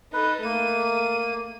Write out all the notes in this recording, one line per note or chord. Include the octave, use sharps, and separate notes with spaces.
D#4 A4 B4
A3 A#3 D#7